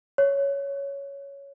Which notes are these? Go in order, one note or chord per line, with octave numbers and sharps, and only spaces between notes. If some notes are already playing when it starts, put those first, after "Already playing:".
C#5